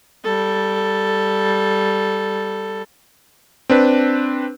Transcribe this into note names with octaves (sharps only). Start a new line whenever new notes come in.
G3 A4
C4 D4 B4